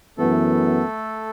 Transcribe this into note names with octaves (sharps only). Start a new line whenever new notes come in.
F#2 E3 A3 B3 A4